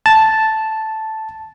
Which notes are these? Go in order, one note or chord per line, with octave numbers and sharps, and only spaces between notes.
A5